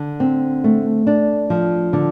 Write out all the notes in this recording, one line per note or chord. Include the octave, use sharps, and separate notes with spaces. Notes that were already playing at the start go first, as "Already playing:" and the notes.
Already playing: D3
C4
A3
D4
F3
D3